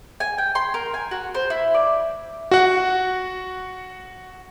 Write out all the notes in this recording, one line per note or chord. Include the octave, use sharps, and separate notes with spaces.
G#5
G5
C6
A#4
G#5
F#4
C5
E4
D5
F#4 F#5